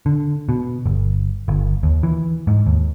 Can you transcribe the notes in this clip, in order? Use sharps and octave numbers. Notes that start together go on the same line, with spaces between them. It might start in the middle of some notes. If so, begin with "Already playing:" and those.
D3
B2
G1
G1
D#2
E3
G#2
D#2